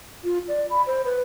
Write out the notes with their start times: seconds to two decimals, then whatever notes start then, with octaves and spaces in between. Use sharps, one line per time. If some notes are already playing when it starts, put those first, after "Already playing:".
0.24 F4
0.48 D5
0.70 B5
0.86 C5
1.05 B4